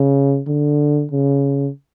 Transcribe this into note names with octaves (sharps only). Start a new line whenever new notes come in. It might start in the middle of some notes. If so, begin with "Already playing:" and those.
Already playing: C#3
D3
C#3